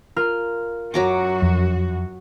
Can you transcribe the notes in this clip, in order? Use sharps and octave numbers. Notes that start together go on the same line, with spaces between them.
F4 A#4 F6
F#2 F#3 F#4 A#5 D6
F2